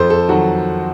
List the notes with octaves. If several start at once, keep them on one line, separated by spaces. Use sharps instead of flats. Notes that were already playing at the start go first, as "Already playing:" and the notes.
Already playing: F2 A4 C5
A4
D#3 F#3 F#4